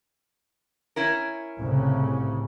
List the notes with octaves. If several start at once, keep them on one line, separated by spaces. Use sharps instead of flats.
C#4 E4 A#4
C2 A2 C#3